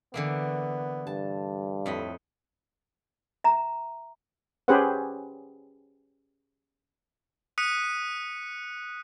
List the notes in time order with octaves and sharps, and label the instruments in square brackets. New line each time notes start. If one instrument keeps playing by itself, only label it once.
[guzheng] D3 E3 A#3 [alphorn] B3
[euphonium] G2 [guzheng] A5
[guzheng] F2 D#5 B5 [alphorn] A2
[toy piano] E5 A#5
[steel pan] C#4 G4 G#4 B4 C5 F#5
[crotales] D#6 F#6 B6 C#7 D#7